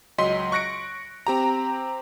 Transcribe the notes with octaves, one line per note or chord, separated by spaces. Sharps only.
C#2 F#3 D#5 C6 B6
C#6 F#6 A#6 C#7 D7
C4 G4 A#5